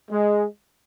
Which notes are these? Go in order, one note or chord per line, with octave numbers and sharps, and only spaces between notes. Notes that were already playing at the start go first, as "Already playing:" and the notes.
G#3